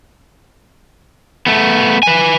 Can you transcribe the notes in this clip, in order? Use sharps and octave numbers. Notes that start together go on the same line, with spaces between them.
A3 B3
B4 G#5